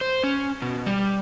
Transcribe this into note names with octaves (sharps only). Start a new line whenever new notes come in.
C5
C#4
B2
G3